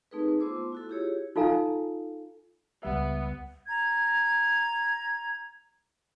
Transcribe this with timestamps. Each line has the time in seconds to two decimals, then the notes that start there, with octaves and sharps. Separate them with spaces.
0.11 A3 C4 D#4 G#4 A4 B4
0.40 B3 F4 C5 C6 D6 E6
0.56 A3
0.72 E4 F#4 A4
0.89 E4 F4 G4 G#4 C#5
1.36 D#4 F4 A4 F5 G#5 A#5
2.83 C#2 G3 B3 E5
3.68 A#5 G#6